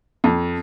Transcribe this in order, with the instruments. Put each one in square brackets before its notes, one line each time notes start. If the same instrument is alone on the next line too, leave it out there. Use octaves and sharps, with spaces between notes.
[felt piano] F2